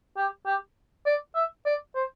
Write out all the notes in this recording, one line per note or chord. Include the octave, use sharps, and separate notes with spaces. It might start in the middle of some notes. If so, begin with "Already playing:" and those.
G4
G4
D5
E5
D5
C5